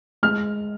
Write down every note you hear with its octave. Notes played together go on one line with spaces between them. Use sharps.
G#3 F6